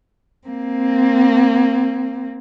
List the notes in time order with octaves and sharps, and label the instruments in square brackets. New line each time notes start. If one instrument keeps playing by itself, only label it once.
[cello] A#3 C4